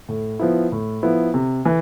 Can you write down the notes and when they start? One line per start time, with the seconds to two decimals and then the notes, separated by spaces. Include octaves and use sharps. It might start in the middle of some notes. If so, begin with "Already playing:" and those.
0.09 A2
0.39 F3 B3 E4
0.72 A2
1.03 F3 B3 E4
1.34 C3
1.65 E3